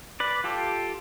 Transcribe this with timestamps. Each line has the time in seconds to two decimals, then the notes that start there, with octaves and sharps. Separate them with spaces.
0.20 B4 D5
0.44 F4 G4 A4